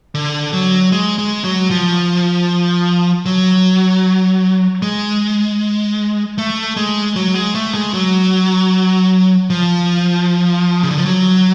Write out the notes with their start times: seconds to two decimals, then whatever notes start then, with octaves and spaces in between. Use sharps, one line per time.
0.15 D3
0.53 F#3
0.92 G#3
1.18 G#3
1.44 F#3
1.70 F3
3.26 F#3
4.82 G#3
6.38 A3
6.77 G#3
7.16 F#3
7.35 G#3
7.55 A3
7.74 G#3
7.94 F#3
9.50 F3
10.83 C#3
10.90 D3
10.98 F3
11.05 F#3